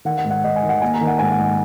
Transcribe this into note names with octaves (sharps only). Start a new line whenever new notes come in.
D#3 F#5
F#5
G#2
F#5
G#2 D#5
G#5
D#3
F#5
A#3 G#5
A#5
D#3
F#5
G#2 G#5
F#5
G#2